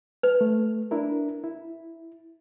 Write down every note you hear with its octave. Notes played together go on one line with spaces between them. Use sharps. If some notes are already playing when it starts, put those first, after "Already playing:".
B4
A3
D4 E4 A#4
E4